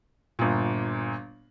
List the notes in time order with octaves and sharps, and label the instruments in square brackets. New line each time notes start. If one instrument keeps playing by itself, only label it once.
[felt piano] G1 A#2